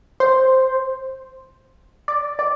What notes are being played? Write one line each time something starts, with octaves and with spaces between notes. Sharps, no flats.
C5
D5
D5